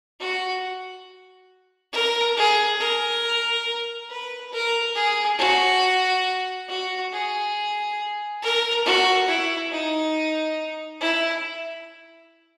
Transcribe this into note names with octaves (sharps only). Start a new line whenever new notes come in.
F#4
A#4
G#4
A#4
B4
A#4
G#4
F#4
F#4
G#4
A#4
F#4
E4
D#4
E4